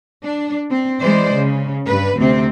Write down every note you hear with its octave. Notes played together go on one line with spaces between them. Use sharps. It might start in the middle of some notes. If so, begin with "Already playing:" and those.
D4
C4
E3 G#3 C5 D5
C#3
G2 B4
D2 C3 C4